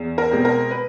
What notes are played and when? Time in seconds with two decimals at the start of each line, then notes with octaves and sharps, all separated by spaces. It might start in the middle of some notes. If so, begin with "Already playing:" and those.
Already playing: E2
0.18 A#4
0.31 B2 G#3 C4
0.45 A#4
0.71 B4